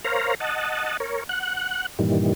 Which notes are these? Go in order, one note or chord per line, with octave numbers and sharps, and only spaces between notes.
A#4 C5 C#5 F5 A#5
D#5 F#5 A5
A#4 C#5
F#5 F#6
G2 A#2 D#3 E3 G3